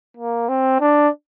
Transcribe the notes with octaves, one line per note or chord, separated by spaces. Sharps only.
A#3
C4
D4